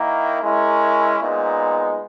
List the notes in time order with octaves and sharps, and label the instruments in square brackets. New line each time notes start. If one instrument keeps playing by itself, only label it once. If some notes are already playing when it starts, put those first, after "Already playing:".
Already playing: [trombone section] D#3 A#3 E4
G#3 C#4 E4 A#4
A#2 G#3 B3 D#4